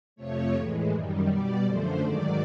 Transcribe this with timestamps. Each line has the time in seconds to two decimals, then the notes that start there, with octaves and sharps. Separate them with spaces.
0.16 F2 C3 F3 A3 C#5
0.53 A2 E3 G#3
0.90 F#2 D#3 G3
1.26 B2 G3 D5
1.63 F#2 D3 F3 A3 C5
1.99 G#2 D#3 F#3 D5